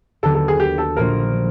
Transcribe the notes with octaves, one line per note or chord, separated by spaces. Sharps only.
D#2 D3 F#3 B3 A4
A4
G#4
G4
A4
A#1 A#2 F3 A#3 A#4